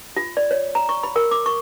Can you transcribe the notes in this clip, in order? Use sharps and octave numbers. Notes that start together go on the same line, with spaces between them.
F4
D5
C#5
A#5
C#6
B5
A#4
D6
C#6